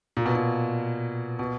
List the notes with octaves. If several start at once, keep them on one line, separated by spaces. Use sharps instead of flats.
A#2
B2
A#2
B2